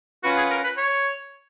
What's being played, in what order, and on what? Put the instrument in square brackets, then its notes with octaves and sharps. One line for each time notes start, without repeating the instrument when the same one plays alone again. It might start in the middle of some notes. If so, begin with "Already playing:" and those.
[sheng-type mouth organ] C#4 F4 B4 F#5 [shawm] F#4
[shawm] G#4
A#4
B4
C#5